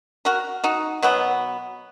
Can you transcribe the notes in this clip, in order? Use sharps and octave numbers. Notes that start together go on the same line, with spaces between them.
F#4 A#4
D#4 F#4
B2 F#3 B3